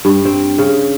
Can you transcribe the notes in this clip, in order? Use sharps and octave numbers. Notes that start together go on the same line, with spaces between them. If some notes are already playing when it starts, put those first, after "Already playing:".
G2
C4
C#3